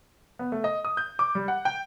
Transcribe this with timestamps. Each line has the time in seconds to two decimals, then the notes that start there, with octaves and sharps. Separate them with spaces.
0.39 B3
0.52 A3
0.64 D#5
0.85 D#6
0.97 G6
1.19 D6
1.35 G3
1.48 F#5
1.65 G5